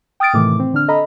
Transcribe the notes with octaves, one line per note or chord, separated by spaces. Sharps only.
G5 D#6 F6 A6 D7
A2 C3 D#3 E3 A3 D6
C4
D3 D4 F6
A4 D#5 A#5 B5